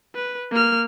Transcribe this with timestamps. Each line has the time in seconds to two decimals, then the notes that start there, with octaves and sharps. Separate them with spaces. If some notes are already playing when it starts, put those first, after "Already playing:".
0.15 B4
0.51 A#3 F6